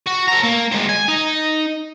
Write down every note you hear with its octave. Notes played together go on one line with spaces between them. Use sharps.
F#4
A4 A#5
A#3
G#3 C4
G#5
D#4